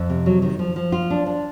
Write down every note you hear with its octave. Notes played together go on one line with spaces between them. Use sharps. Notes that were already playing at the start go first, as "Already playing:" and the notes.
Already playing: F2
C3
F#3
D#3
F3
F3
F4
D4
D4